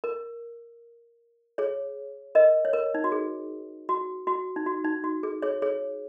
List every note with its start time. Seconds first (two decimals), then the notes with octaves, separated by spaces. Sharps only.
0.04 A#4
1.58 G#4 C#5
2.35 A#4 D#5
2.65 C#5
2.73 A#4
2.94 D#4
3.04 F#4
3.12 G#4
3.89 F#4
4.27 F#4
4.56 D#4
4.66 F#4
4.84 D#4
5.04 F#4
5.23 G#4
5.42 G#4 C#5
5.62 G#4 C#5